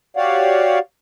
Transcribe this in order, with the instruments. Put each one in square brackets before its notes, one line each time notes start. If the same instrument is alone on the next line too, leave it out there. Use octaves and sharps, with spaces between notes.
[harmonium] F#4 G4 C#5 D5 F5 F#5